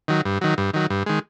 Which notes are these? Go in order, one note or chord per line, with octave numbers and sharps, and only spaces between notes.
D#3 F#3
G2
D#3 F#3
G2
D#3 F#3
G2
D#3 G#3